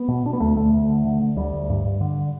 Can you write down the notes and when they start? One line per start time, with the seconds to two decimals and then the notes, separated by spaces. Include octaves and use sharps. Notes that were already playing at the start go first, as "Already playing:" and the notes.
Already playing: B3
0.08 B2
0.25 B2 D4
0.33 B3
0.40 D2 A3
0.56 D2 A3
0.73 D2
0.89 D3
1.05 D3
1.20 D3
1.36 D2 G3
1.53 D2
1.70 G2
1.85 G2
2.01 D3